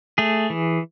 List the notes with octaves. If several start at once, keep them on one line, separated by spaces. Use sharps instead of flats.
A3 G#4
E3